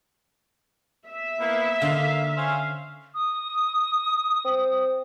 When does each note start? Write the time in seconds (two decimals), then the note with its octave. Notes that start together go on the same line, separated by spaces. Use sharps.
1.07 E5
1.40 A#3 B3 E4
1.82 D3 A#3 D#4 F5 C6
2.36 C#4 C5 F5
3.14 D#6
4.44 C4